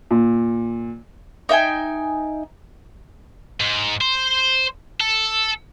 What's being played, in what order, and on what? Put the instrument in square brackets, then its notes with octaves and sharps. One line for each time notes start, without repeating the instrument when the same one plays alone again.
[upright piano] A#2
[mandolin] D#4 E5 G5 G#5
[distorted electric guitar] G#2
C5
A4